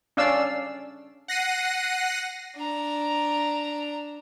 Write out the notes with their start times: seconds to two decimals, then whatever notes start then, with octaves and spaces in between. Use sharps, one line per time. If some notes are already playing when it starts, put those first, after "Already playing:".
0.17 C#4 D4 D5 F5 E6
1.28 F#5 A#6 C7 D#7
2.56 D4 A#5